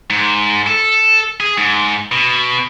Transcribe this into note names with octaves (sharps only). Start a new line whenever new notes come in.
G#2
A4
G#4
G#2
B2